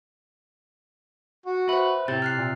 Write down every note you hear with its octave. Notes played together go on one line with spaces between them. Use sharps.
F#4
B4 C5 E5
A2 C3 G4 G6 A6
F6 F#6 C7
A#2